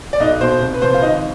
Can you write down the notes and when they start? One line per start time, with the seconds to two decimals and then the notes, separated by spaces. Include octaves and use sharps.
0.13 D5
0.20 B1 D#4 D#5
0.41 B2 C5
0.61 C2
0.74 B4
0.82 C3 F3 C5
0.94 F5
1.02 G#1 D#4 D#5